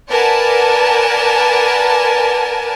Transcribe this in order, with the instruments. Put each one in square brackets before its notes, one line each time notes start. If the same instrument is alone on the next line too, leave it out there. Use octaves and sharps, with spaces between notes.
[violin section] A#4 B4 D5 F#5 G#5 A5